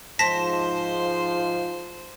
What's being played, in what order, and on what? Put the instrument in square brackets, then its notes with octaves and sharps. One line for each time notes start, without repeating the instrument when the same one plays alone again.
[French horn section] G#2 F3 [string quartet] C5 [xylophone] A5 A#6 B6